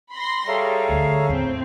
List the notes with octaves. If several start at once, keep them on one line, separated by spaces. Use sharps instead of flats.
B5 C6 A#6
G3 G#4 A4 C#5 E5 F5 A#5
D2
E2 A2 C4